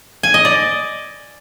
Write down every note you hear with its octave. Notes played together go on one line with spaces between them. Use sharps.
G#5
D#5
D5